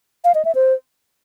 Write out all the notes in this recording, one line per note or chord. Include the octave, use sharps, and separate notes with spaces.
F5
D#5
E5
C5